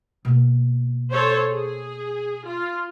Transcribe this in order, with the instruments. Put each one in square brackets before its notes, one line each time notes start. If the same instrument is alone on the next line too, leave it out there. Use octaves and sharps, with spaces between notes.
[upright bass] B2 A#3
[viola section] A4 C5 C#5
G#4
F4